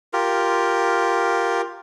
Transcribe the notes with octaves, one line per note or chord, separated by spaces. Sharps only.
F4 G4 A#4